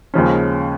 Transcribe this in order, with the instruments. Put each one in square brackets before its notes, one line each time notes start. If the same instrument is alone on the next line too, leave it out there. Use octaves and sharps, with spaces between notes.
[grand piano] D#2 C#3 F3 G#3 C#4